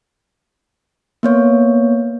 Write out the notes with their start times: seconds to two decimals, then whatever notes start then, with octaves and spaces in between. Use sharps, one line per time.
1.23 A#3 B3 C#5